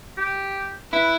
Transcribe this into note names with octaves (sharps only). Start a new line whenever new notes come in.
G4
E4 B4